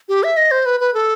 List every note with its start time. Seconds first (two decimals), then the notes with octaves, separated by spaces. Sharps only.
0.09 G4
0.23 E5
0.37 D#5
0.51 C5
0.66 B4
0.80 B4
0.94 A4